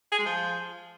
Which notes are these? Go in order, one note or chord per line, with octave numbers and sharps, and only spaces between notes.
G#4
G#3
F3